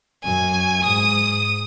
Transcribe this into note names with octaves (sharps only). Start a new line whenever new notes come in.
F#2 G#5
G#2 D#6